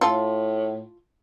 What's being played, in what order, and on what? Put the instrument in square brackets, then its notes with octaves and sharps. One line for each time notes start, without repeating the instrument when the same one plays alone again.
[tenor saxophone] A2 [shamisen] F4 A4